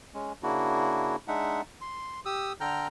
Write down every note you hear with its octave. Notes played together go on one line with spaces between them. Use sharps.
G#3 C#4
C#3 A#3 D4 E4 F#4
G#3 D4 D#4 E5 F#5
C6
G4 D#6 E6
D3 A4 G5 A#5 F6 G6